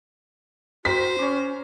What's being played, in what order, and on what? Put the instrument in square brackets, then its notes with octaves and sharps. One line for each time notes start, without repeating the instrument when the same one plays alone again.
[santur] C4 A#4 [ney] F#4 [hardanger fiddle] C5 [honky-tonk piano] B6
[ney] C#4 [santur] C#5 D6